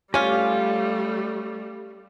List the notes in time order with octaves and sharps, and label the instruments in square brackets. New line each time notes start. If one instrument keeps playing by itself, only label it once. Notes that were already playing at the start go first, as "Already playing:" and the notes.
[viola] G3 A3 [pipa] C#4 F4 [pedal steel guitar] G4 C#5 F6